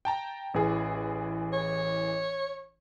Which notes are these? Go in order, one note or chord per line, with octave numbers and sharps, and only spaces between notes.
G5 A5 A#5
A1 E3 G#4
C#5